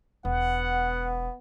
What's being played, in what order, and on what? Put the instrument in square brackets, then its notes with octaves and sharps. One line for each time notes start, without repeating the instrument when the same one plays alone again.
[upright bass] E1 [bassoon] B3 [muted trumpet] F#5